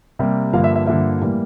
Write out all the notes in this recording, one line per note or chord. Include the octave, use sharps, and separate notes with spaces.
C3 G3 A#3
G2 D3 F3 A#3 F5
E5
E5
G2 D3 F3 A#3 E5
A2 E3 G3 A#3